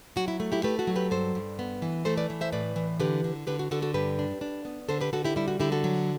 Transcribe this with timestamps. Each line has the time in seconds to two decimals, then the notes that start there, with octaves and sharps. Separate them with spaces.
0.16 F#3 F#4
0.28 E4
0.40 A3
0.52 E4 G4
0.63 A3 G4 B4
0.79 F#4 A4
0.87 F#3
0.96 G4 B4
1.11 G2 A4 C5
1.35 G2
1.59 B3
1.82 E3
2.05 A3 A4 C5
2.17 B4 D5
2.30 E3
2.41 C5 E5
2.52 A2 B4 D5
2.76 E3
3.00 D3 G4 B4
3.24 D3
3.47 D3 G4 B4
3.59 F#4
3.71 D3 F#4 A4
3.82 F#4 A4
3.94 G2 G4 B4
4.19 D4
4.41 D4
4.65 B3
4.89 D3 A4 C5
5.01 G4 B4
5.13 D3 F#4 A4
5.24 E4 G4
5.36 G3 E4
5.48 F#4
5.60 D3 E4 G4
5.72 F#4 A4
5.84 F#3